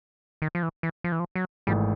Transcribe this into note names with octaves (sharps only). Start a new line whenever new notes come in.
D#3
F3
E3
E3
F3
E3
F3
F#3
G#1 G#2 E3 G3 A3